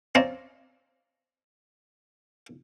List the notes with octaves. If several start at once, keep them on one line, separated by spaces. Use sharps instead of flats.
C4 C#4 D5 F5 A#5